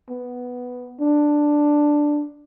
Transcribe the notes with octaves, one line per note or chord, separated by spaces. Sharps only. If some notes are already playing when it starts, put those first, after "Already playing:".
B3
D4